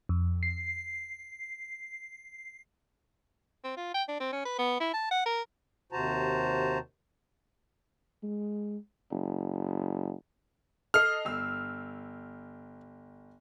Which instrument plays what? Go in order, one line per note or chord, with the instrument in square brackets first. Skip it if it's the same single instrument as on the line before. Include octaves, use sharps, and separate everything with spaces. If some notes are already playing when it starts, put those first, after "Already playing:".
[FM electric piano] F2
C7
[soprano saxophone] C4
F4
G5
D4
C4
C#4
B4
B3
E4
A5
F#5
A#4
[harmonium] D#2 C3 F#4 C5 A5 A#5
[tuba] G#3
F#1
[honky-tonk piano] A4 D#5 C7 [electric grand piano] F6
[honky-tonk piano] G1 E6